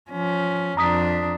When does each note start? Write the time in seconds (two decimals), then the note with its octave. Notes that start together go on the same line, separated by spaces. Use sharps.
0.11 F3 C#4
0.77 F2 D4 A#5 D#6 B6